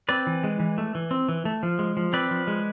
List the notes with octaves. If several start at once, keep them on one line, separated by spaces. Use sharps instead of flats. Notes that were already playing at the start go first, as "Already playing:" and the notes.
C4 B4 D5
E3
G#3
E3
A3
E3
C4
E3
A3
F3
G#3
F3
C4 B4 D5
F3
G#3